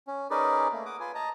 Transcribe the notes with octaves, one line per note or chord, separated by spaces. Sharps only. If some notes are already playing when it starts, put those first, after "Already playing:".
C#4
C#4 D#4 G#4 A#4 B4 D5
A3 A#3
F#5 D6 D#6
F4 B4 G#5
D#5 A5 A#5